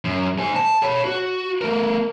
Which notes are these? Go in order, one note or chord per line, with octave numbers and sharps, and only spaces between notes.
F#2
C5 G#5
A5
C#5 B5
F#4
A3 A#4